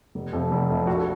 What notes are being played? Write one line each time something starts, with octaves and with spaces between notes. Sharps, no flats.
F1
F2 C3 F3
F1
F2 C3 F3
A#1 F#4
A4